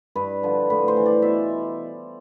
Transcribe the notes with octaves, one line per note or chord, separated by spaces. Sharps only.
G2 B4
D3 F3
A2 B4
C5
E3
D5
B2 E5